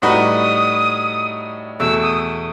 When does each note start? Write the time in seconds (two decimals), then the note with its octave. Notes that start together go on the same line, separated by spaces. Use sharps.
0.02 A2 G3 D#4 F#4 B4 D#6
1.80 E2 B2 A3 E6
2.02 D#6